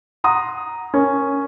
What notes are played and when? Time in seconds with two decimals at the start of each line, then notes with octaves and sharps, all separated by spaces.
0.24 F#5 A#5 C6 D#6
0.94 C#4 A#4